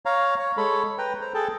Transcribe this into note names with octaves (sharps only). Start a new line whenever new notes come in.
C#5 F5 A#5
C#5
G#3 A4 C#5 B5
B4 G5 A#5
C5 A#5
G#4 A4 G5 A5